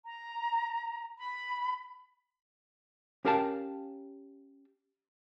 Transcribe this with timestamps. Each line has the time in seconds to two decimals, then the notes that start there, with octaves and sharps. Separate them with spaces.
0.06 A#5
1.18 B5
3.25 C#4 G4 A#4 F5 G5 A5